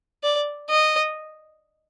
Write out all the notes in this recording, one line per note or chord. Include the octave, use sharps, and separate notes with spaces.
D5
D#5